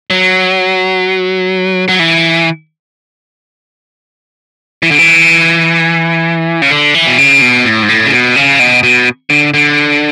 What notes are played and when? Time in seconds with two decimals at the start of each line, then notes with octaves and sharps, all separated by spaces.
0.10 F#3
1.88 F#3
1.99 E3
4.83 E3
4.91 D3
4.99 E3
6.62 C#3
6.71 D3
6.94 E3
7.07 B2
7.18 C#3
7.42 B2
7.65 A2
7.83 G#2
7.89 A2
8.06 C#3
8.12 B2
8.36 C#3
8.59 B2
8.83 B2
9.30 D3
9.54 D3